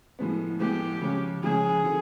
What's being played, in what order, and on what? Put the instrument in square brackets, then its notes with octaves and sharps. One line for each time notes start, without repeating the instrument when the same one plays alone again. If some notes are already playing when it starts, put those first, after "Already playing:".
[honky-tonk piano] A2 F3 G#3 B3
[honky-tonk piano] A2 F3 G#3 B3 [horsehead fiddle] G4
[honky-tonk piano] C#3 F3 G#3 C#4
[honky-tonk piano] C#3 F3 G#3 C#4 [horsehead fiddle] G#4
[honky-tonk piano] D3 F3